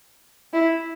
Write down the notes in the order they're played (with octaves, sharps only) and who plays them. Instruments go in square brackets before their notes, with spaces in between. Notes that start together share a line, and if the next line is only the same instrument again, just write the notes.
[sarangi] E4